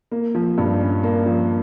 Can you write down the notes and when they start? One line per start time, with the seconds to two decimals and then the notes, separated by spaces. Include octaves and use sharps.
0.12 A#3
0.35 F3
0.58 G2
0.80 C#4
1.03 A#3
1.26 F3